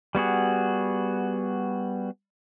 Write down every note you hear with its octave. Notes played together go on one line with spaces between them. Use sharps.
G3 B3 F#4 G#4